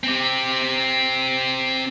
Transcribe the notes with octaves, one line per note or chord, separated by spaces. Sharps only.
C4 G4